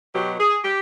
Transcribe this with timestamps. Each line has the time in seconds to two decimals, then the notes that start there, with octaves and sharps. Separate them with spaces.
0.14 B2 F#3 G4
0.40 G#4
0.64 G4